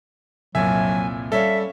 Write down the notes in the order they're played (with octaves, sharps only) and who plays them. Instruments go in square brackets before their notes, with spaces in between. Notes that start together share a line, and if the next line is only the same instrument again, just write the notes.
[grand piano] C2 F2 A#2 [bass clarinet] F#3 [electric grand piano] E5 [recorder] G#5
[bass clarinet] G3 [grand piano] C#4 C#5 F5 [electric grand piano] A4 [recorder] E5